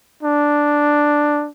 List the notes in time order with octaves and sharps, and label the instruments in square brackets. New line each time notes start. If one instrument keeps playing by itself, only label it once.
[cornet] D4